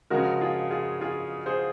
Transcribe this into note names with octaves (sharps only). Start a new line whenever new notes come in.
C#3 F3 G#3 F#4 A#4
F4 G#4
F4 G#4
F4 G#4
G#4 C5